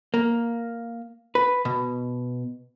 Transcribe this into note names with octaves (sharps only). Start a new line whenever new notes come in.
A#3
B4
B2